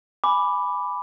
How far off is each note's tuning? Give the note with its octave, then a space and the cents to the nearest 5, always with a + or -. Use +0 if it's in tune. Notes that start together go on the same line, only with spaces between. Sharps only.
G#5 +0 B5 +0 D6 +0